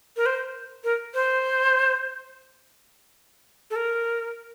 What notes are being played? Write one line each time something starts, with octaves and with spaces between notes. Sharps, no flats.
A#4
C5
A#4
C5
A4
A#4